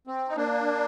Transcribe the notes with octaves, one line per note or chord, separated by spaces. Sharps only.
C4
D#4
A#3 D4